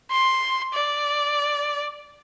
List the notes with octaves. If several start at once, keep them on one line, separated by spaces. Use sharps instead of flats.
C6
D5